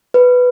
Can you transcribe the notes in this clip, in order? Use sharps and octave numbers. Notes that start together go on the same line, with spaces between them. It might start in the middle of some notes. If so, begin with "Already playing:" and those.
B4